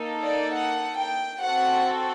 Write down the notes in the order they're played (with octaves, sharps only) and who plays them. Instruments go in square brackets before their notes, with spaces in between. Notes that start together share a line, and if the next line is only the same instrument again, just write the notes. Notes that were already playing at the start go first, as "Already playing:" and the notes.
Already playing: [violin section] A#3 D#4 A4
D5
F#5
G5
C4 F#4 A4 F#5